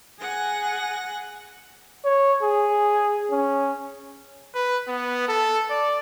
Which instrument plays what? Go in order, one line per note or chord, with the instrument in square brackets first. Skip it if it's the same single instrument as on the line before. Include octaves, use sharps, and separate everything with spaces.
[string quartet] G#4 F#5 G#5 A#6
[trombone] C#5
G#4
C#4
[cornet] B4
B3
A4
D5